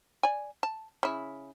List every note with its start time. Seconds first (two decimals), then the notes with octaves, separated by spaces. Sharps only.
0.23 D5 G#5
0.63 A5
1.03 C#3 E4